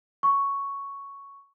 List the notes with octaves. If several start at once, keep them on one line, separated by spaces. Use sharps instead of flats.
C#6